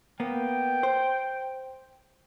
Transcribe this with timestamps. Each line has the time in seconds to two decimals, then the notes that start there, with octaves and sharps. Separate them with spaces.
0.20 A#3 B3 G5
0.83 C5